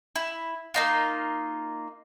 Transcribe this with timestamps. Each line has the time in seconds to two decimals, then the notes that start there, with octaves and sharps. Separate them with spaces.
0.16 E4
0.74 A#3 D#4 F4